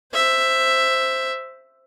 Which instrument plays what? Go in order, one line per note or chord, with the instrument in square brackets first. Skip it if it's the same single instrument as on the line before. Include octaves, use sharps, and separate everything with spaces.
[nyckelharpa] C5 E5